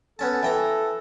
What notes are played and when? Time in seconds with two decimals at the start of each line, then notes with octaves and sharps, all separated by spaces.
0.19 B3 C#4 A4 A5
0.43 E3 A4 G5 A#5